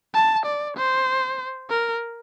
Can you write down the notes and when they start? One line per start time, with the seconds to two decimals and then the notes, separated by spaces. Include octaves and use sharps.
0.15 A5
0.46 D5
0.77 C5
1.70 A#4